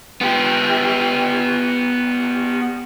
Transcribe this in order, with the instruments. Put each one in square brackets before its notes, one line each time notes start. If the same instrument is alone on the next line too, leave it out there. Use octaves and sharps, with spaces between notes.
[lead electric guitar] B3 G4